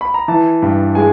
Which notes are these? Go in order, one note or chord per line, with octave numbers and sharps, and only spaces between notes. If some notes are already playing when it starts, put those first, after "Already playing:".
B5
A#5
E3 A5
G2
G#3 G#5